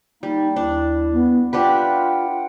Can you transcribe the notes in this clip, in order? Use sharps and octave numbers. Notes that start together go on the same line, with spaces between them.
G3 A#3 D#4
D#2 D4 E4
B3
D4 F4 G4 B4 F#5 G5